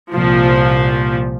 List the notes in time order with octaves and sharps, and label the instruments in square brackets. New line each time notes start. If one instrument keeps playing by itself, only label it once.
[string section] C2 A#2 F3